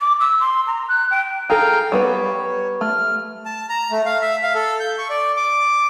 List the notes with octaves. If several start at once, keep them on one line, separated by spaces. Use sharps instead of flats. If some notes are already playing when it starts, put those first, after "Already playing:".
D6
E6
C6
A#5
F#6
G5
G#4 A4 F5 G5 A#5
G3 B3 B4 C#5
A3 F6
A5
A#5
A3
F5
E5
F5
A4
G6
C#6
D5
D6